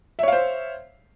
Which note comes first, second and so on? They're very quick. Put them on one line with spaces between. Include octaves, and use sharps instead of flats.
E5 C#5 F5 C5